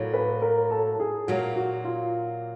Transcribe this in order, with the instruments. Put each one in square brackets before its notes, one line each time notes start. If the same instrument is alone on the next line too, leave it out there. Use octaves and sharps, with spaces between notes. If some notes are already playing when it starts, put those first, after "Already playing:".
Already playing: [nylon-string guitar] A2 F#3 A#3
[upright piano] B4
A#4
A4
G#4
[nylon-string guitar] A#2 F#3 A#3 [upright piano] F#4
[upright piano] F#4
F4